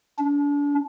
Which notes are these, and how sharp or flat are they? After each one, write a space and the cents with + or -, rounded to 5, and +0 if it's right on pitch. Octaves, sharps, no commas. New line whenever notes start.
D4 -35